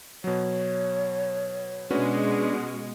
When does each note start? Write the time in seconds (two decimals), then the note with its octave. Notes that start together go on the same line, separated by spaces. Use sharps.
0.24 B2 F#3 C#5
1.91 B2 G#3 C#4 D4 F#4 B4